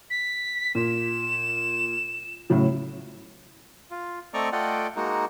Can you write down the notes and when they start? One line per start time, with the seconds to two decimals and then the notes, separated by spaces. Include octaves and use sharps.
0.10 B6
0.75 A#2 E7
2.50 A2 C#3 F#3
3.91 F4
4.34 A3 C4 D5 D#5 A#5 C#6
4.52 A3 F4 D5 D#5 F#5 G5
4.96 G#3 A#3 D#4 F#4